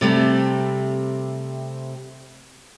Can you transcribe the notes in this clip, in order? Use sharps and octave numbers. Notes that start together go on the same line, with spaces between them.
C3 G3 A3 C4